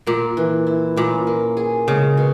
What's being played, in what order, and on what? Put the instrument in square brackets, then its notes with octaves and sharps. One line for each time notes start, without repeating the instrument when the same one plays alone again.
[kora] A#2 [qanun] A#3
[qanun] E3
E4
[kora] A#2 [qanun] C#4
[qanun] A#3
G#4
[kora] C#3 [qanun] G#3
[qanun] B2